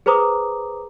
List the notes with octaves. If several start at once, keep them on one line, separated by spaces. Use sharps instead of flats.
G#4 B4 C5 A#5 D6 D#6